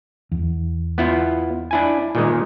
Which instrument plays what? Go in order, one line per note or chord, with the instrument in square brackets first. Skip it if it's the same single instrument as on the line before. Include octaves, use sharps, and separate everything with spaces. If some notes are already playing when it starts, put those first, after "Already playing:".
[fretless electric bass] E2
[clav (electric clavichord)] B3 E4 F4
D4 E4 G#5
A#2 D#3 G#3